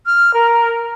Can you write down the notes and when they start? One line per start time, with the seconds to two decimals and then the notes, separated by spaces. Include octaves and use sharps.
0.06 F6
0.34 A#4